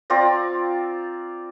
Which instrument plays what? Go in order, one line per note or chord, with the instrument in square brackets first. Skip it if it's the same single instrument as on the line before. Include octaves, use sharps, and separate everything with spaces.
[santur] C4 F4 D5 A#5